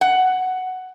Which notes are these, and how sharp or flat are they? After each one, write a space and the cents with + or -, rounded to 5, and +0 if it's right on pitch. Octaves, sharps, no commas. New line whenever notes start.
F#5 +5